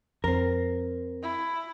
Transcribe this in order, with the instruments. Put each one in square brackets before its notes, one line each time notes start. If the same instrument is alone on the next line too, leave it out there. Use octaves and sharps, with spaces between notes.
[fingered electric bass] F2 [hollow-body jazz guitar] C4 A#4
[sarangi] E4